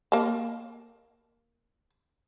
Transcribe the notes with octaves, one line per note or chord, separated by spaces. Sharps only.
A#3 A5